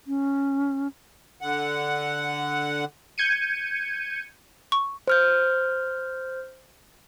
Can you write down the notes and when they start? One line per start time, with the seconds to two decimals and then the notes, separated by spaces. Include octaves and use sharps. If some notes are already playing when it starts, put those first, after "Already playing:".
0.07 C#4
1.41 D3 F#5
3.18 G6 G#6 C#7 D#7
4.72 C#6
5.08 C5 F6 G6